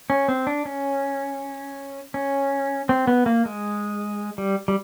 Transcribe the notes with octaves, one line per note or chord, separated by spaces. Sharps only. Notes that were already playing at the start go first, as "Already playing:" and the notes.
C#4
C4
D4
C#4
C#4
C4
B3
A#3
G#3
G3
G3